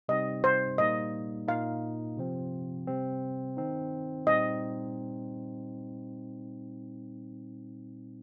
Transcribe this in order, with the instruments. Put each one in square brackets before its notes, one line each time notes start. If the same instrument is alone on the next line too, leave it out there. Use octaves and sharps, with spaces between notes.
[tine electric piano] C3 G3 C4 D#4 [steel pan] D#5
[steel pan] C5
[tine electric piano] A#2 G3 A#3 D#4 [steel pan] D#5
[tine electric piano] A#2 A#3 D#4 [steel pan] F5
[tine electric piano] C3 F3 C4
C3 G3 C4
D#3 C4 D#4
[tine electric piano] A#2 G3 C4 D#4 [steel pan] D#5